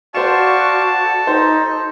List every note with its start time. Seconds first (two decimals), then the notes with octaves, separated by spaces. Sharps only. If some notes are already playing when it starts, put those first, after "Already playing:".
0.15 F#4 C5 D5 F5 A5 C#6 E7
1.04 A4
1.27 D#4 C5